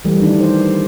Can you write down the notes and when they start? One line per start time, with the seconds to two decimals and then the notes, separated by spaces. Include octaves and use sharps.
0.05 E3 G3 A3
0.22 D#3 D4
0.40 C5